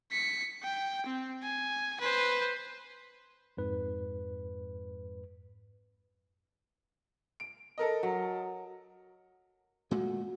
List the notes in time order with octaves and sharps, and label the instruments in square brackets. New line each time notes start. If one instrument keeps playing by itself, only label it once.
[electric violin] B6 C#7
G5
C4
G#5
B4 C5
[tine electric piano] F2 G#2 B4
[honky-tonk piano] D7
A4 A#4 D#5
[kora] F#3
[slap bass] A#2 G#3 A3 [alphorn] F#4